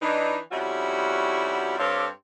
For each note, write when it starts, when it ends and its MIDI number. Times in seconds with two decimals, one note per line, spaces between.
0.02 0.37 52
0.02 0.37 62
0.02 0.37 63
0.52 1.75 41
0.52 1.75 55
0.52 1.75 61
0.52 1.75 64
0.52 1.75 66
1.78 2.07 43
1.78 2.07 60
1.78 2.07 67
1.78 2.07 69
1.78 2.07 73
1.78 2.07 77